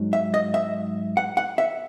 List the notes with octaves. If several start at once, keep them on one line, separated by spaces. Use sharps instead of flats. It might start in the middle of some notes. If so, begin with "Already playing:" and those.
Already playing: G#2 F#3
E5
D#5
E5
F#5
F#5
E5